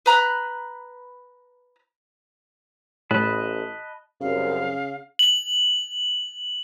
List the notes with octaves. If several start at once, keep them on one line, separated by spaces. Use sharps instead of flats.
B4 A#5 B5 F#6
A1 A2 D#5 A5 B5 F#6
C2 F#2 C#3 F5
F#7